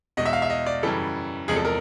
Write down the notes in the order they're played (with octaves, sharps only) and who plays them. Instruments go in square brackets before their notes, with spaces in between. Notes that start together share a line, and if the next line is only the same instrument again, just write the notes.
[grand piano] E2 B2 G#3 D#5
E5
F5
E5
D#5
D5
F#2 C#3 E3 G3 A4
E2 C3 F3 G#3 G#4
A4
A#4